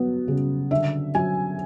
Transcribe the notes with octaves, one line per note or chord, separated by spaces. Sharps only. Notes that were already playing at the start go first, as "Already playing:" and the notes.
Already playing: F#3 B3
C#3
D3 E5
F#3 G#5